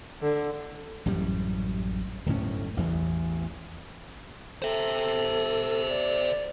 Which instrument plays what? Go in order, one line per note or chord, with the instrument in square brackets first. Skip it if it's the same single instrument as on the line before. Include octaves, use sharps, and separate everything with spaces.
[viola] D3
[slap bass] A1 F#2 A2 G3
D1 G1 A2 C#4
A1 E2 E3
[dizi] A4 [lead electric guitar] C5 E5
[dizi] D5